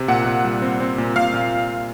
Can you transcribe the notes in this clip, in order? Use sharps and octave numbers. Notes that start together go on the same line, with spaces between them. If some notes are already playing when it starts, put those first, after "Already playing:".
Already playing: C3
A#2 F#5
A#2
G3
C4
C4
A#2
A#2 F5
A#2